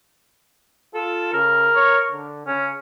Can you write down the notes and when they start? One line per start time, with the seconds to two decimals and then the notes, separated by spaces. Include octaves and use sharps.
0.95 F4 A4
1.33 C#3 A#4
1.75 C#5
2.12 D3
2.47 C#3 C#4